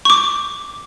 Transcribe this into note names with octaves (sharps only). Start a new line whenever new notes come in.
C#6 D6